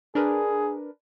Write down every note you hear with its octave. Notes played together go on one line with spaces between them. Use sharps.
D4 G#4 A#4 B4